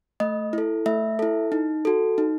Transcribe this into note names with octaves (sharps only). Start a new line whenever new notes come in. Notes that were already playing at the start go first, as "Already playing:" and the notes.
A3 D#5
E4 A4
A3 E5
E4 A4
D#4
F#4 A4
D#4